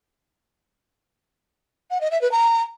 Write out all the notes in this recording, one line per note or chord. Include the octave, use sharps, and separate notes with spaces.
F#5
D#5
E5
B4
A#5